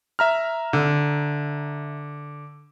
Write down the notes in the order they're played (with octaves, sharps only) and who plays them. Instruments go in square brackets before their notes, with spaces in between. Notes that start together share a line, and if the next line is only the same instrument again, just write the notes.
[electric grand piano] E5 A#5 F6
[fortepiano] D3